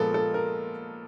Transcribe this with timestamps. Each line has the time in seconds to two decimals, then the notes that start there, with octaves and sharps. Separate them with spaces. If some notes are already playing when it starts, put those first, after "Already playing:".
Already playing: A#2 F3 G#3 B3 A4 A#4
0.14 A4
0.34 A#4